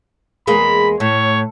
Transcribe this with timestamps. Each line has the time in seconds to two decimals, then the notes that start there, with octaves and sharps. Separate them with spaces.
0.47 E2 G#3 A#3 B5
1.00 A2 C#5